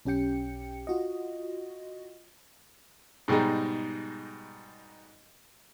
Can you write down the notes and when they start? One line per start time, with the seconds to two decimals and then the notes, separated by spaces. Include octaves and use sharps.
0.05 B1 C#4 G4 G5 C#7
0.87 F4 F#4 D#5
3.28 G#2 B2 G3 G#3 D#4